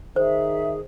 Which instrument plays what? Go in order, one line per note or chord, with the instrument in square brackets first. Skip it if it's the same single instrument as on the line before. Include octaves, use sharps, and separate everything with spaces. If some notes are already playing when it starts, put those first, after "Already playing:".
[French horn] D#3 [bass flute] G#4 [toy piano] C5 [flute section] E5